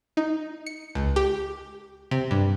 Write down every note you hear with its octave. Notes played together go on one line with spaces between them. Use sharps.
D#4
C#7
C#2
G4
C3
G2